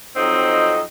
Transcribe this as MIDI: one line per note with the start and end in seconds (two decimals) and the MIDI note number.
0.16 0.81 41
0.16 0.81 54
0.16 0.81 60
0.16 0.81 63
0.16 0.81 75